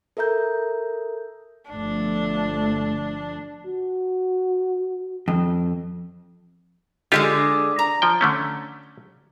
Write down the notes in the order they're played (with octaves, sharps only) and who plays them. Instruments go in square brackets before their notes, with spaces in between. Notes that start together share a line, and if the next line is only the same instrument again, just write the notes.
[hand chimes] A4 A#4 E5 A#5 G6
[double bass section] G1 F3 A3 [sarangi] D4
[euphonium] F#4
[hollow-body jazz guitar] F2
[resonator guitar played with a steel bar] D3 G#3 G#4 [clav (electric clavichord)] F4 G4
[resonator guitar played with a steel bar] A#5
[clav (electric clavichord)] F3 G5
D3 A3 C#4